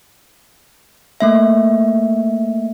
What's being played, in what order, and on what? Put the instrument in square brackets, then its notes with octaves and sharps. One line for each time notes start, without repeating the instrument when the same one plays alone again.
[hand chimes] A3 A#3 E5